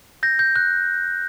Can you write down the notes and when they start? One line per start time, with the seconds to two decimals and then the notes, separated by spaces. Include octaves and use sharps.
0.23 G6 A#6
0.39 G6
0.56 F#6